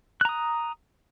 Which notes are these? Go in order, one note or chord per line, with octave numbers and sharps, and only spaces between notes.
A#5 D#6 F#6